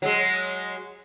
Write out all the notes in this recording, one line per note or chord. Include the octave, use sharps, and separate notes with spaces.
F#3 G#3